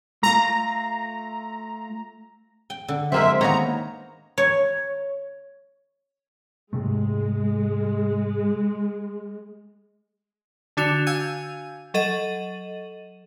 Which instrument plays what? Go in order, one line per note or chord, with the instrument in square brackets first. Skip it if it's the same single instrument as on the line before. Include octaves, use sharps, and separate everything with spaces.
[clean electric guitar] A3 F4 [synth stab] A#5
[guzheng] G5
D3
[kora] G#3 A#3 C4 [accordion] E5
[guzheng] D#3 A#3 B3 [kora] C#5 [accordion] A#5
[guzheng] C#5
[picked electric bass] G#2 C3 A3 [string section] G#3
[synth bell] D3 D4 F#4 E7 F7
F5 G#5 E6 G6 G#6 D#7
F#3 A4 D#5 D#7 F#7